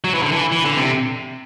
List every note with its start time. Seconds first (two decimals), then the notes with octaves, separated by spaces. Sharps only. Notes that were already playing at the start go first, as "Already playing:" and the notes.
0.04 F#3
0.14 E3
0.22 D3
0.32 E3
0.52 E3
0.65 D3
0.77 C3